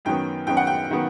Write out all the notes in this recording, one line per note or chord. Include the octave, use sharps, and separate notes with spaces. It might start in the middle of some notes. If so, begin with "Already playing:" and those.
F#2 D#3 F#3 B3 G5
F#2 D#3 F#3 B3 G5
F#5
G5
D#3 F#3 B3